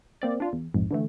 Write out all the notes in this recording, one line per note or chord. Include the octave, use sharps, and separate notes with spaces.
A#3 C4 D5
D4 F4
E2
A#1 F2 G#2
D3 E3 A3